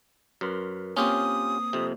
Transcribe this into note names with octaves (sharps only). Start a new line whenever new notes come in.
F#2 A#4 B4 C6
A#3 C4 C#4 F4 G4 D#6
F2 C3